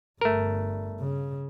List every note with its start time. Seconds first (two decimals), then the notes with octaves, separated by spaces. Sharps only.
0.21 G1 G2 A3 A#4
1.00 C#3